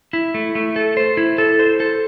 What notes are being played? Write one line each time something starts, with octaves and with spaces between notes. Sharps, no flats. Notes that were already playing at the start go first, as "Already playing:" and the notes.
E4
A3
A3
A4
C5
E4
A4
C5
A4